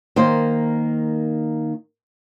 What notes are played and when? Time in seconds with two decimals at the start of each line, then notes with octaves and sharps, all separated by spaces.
0.16 D#3 A#3 C5